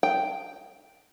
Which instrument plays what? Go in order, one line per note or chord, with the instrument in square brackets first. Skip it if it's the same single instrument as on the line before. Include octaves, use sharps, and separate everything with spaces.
[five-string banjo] G5